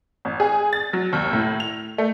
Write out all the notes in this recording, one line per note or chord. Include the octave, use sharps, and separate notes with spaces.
A1
G#4
A6
F#3
D#2
A2
F7
A3